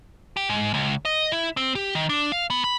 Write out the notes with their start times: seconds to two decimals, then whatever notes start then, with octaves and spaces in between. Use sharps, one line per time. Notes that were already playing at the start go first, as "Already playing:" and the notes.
0.37 G4
0.50 G#2
0.74 C#2
1.05 D#5
1.32 E4
1.57 C4
1.75 G4
1.95 D#3
2.09 D4
2.32 F5
2.50 B3
2.64 B5